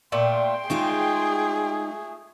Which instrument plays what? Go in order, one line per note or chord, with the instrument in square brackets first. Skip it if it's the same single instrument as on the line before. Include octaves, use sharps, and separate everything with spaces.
[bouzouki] A#2 A3 [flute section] G5 C6
[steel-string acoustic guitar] G#3 D#4 F4 [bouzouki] A3 [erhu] G#4